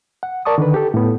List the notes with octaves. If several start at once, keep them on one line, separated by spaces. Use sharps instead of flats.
F#5
A#4 D5 A5 C#6 D#6
D3 D#3 D4 B4
G4 A4
A2 B3